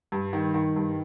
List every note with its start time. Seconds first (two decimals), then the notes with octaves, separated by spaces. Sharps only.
0.12 G2
0.33 D#3
0.54 D#3
0.76 G2